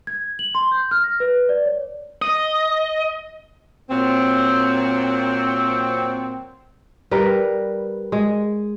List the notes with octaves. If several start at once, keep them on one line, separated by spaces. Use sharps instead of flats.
G#6
F#7
C6
G6
F6
A#6
B4
D5
C#5
D#5
A#2 F#3 C4
G3 A#4 B4
G#3